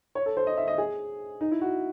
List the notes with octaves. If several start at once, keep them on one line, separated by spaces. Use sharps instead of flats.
C#5
A4
C5
D#5
E5
D#5
G#4
D#4
E4
F#4